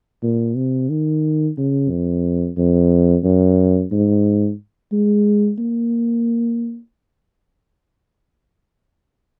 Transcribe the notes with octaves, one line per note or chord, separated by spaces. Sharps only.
A#2
C3
D#3
C#3
F2
F2
F#2
G#2
G#3
A#3